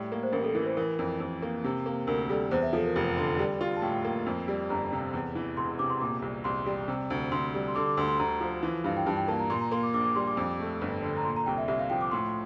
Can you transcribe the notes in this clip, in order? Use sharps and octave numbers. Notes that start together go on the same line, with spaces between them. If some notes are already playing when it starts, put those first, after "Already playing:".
Already playing: A2 G3
A#3
C5
A1 A#4
A4
E3 A#4
C5
E3 A#4
F2
F2
A#3
C3
A#3
D2 A#4
G3 A4
E2 C5
E5
F3 A4
A#4
F1
D3
G3
F4
A5
A2 G5
A#3
F2
G3
G1 A#5
C3
E2
E3
E1 C6
C3 D6
C6
A#2 D6
C2
C2 C6
G3
C3
D2
D2 C6
G3
C6
D3 D6
D6
D2 C6
C6
D2 A#5
F3
E3
G2 F5
G5
G2 A5
G5
A#3 A5
A#5
A#2 C6
A#5
A#3 C6
D6
A#1 D6
D6
G3 C6
D6
F2
A3
G1
D3
A#5
A#2 C6
A#5
C2 G5
E5
C2 E5
F5
F3 G5
D6
A2 C6